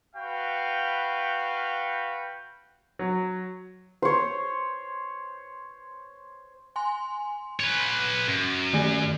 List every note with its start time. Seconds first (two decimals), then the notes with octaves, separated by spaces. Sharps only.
0.15 F#4 B4 F5 G5
2.99 F#3
4.02 C5 C#5
6.76 G#5 C6
7.60 B4 C#5
8.27 F#2
8.73 D#3 A3